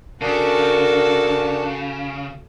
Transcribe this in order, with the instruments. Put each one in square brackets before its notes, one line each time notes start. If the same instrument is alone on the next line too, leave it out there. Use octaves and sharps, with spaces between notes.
[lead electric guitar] C#3 [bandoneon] D4 [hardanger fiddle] F#4 A4 [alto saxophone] A#4